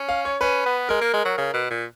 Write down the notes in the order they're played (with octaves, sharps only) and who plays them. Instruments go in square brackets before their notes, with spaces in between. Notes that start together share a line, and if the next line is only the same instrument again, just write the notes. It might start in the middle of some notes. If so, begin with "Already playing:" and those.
Already playing: [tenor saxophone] C#4
[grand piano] F5
C#5
[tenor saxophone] C#4 [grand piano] B4
[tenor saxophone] B3
[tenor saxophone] G#3 [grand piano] A#4
[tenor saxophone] A#3
G#3
F#3
C#3
B2
A#2